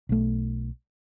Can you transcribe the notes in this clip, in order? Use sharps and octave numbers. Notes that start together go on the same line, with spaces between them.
B1 A3